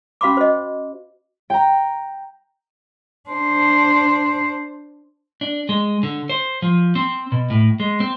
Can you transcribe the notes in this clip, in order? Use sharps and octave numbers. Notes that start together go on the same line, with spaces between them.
C#4 F#4 F5 B5 C6 D6
C5 D#5
G5 A#5
D4 C5
D4
G#3
D3
C5
F3
C4
B2
A2
G#3
C4